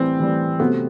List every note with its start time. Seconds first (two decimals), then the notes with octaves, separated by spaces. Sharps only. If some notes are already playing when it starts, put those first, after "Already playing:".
Already playing: A2 E3 G3 C4
0.18 A2 E3 G3
0.59 C3 F#3 A3 B3 C4